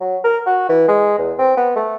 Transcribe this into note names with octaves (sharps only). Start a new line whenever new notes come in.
F#3
A#4
F#4
E3
G#3
E2
C4
B3
A3